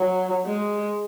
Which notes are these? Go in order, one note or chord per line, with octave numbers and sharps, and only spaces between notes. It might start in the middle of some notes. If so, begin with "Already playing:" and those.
Already playing: F#3
G#3